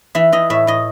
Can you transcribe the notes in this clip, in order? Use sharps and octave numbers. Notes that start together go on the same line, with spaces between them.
E3 E5
E3 D#5
A2 E5
A2 D#5